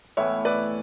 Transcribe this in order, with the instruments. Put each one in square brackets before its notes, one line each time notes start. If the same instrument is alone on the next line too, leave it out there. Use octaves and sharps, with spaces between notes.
[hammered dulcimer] A2 E3 B3 E4 [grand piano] C#5 E5
[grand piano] B4 D5